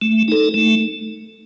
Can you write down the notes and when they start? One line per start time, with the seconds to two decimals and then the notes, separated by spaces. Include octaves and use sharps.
0.01 A3
0.28 D#4 A4
0.54 A3